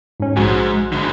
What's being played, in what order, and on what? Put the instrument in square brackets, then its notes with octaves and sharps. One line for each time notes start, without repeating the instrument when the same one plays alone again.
[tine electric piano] G#2 C#4
[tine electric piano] A#1 F#4 G#5 [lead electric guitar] E2 G#2
[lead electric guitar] G#2 D3